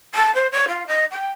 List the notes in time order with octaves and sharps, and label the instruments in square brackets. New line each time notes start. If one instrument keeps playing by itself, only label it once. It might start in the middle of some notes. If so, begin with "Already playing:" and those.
[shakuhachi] A5
C5
C#5
F4
D#5
G5